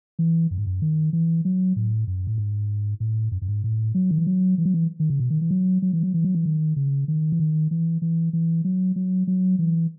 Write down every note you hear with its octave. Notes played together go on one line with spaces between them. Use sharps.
E3
F#2
G#2
F#2
D#3
E3
F#3
A2
F#2
A2
G#2
A2
F#2
F#2
G#2
A2
F#3
D#3
E3
F#3
E3
F#3
E3
D#3
C#3
B2
D#3
E3
F#3
F#3
E3
F#3
E3
F#3
E3
D#3
C#3
D#3
E3
D#3
E3
E3
E3
F#3
F#3
F#3
E3